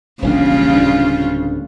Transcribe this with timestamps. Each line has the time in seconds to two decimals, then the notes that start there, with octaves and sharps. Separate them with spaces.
0.22 E1 A#1 C#3 G3 D4 F4
0.75 D1 D4